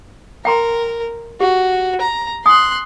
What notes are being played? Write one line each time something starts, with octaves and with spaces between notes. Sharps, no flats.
A#4 G5 A#5 C6
F#4 G4
A#5
G#5 C6 D#6 F#6